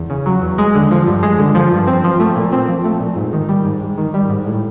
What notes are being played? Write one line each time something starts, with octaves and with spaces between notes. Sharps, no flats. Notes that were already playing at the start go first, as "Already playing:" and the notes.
Already playing: E2
C#3
F#3
E2
G#3
D3
F3
G2
G#3
D3
F3
G2
C4
F3
A3
A#2
C4
F3
A3
A#2
G#2
D#3
G3
G#2
G#2
D#3
G3
G#2
A2